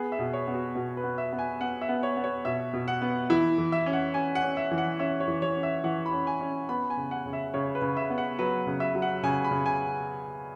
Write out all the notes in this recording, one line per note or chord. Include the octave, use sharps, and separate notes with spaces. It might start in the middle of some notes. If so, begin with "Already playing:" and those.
Already playing: B3 G#4
E5
B2
C#5
B3
F#4
B2
B4
B3
E5
B3
G#5
B3 F#5
E5
B3
C#5
B3
C#5
B2 E5
B2
F#5
B3
E3 E4
E3
E5
C#4
F#5
C#4 G#5
F#5
C#4
E5
E3
F#5
C#4 E5
C#5
E3
C#5
C#4
E5
E3 F#5
B5
C#4
G#5
C#4
B3 B5
G#5
C#3
F#5
C#3
E5
C#3 C#5
B4
C#3
E5
B3
F#5
F#3 B4
C#3
E5
F#3
F#5
C#3 G#5
B5
C#3
G#5